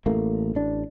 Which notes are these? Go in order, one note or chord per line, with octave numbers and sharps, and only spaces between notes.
A1 A3 A#3
A1 D4